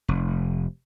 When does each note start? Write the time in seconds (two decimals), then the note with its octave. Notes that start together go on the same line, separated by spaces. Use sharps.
0.08 F1